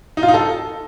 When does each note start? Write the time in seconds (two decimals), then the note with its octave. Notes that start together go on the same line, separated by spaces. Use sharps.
0.17 D#4
0.23 F4
0.28 D#4
0.34 A4